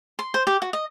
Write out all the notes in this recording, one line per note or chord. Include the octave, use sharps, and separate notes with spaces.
C6
C5
G4
F#4
D#5